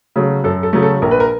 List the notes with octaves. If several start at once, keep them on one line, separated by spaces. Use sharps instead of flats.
C#3 F#3 A3
F#2 A4
A4
C#3 F#3 A3
A4
A#1 A#4
B4
A#4